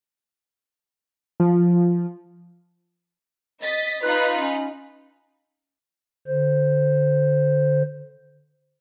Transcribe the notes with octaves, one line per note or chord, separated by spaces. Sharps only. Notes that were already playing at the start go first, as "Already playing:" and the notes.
F3
D#5 A6 B6
D#4 F4 B4 B5
C#4
D3 C5